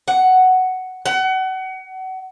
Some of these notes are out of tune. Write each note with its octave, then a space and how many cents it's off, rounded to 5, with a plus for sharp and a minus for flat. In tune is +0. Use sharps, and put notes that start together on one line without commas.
F#5 +5
F#5 +30